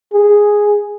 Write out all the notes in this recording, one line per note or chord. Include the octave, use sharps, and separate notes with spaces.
G#4